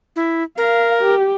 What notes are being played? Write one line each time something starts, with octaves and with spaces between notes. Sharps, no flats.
E4
A#4 F5
G4